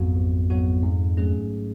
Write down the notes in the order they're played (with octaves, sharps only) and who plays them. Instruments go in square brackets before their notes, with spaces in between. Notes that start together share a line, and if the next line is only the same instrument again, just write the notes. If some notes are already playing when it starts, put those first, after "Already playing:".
Already playing: [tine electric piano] A1 G#2 F#3 B3 F#4 [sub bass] F2
[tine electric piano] A1
G#2 F#3 B3 F#4
G#2
F#3 A3 C#4 G#4